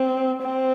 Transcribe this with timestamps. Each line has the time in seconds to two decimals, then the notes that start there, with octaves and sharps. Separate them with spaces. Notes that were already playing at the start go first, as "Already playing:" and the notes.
Already playing: C4
0.43 C4